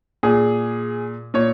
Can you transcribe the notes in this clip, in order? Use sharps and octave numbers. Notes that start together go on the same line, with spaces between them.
A#2 G#4
A#2 C#5